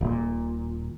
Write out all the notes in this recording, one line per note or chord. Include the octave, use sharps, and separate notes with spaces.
D#1 A#2